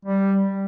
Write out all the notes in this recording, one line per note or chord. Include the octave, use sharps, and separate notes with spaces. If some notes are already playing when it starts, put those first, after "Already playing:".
G3